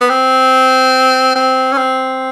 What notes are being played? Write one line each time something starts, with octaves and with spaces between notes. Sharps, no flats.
B3
C4
C4
C#4
C4